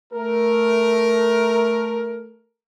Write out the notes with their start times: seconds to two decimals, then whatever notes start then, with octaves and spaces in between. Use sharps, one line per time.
0.13 A3 A#4